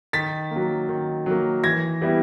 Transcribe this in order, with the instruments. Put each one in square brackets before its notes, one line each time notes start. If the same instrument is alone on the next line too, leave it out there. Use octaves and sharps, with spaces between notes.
[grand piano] D#3 A6 B6
F#3 A#3
D#3
F#3 A#3
E3 G#6 A#6
G3 B3 E4